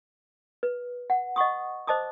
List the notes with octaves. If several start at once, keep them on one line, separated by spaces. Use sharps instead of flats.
B4
F#5
D#5 F#5 C#6 D#6
C5 D#5 A5 D6 D#6